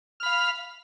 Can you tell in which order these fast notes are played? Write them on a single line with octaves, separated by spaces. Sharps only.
F6 B5 F5